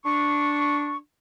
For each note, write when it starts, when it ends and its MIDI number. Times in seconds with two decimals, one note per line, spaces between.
0.05 0.97 62
0.05 0.97 85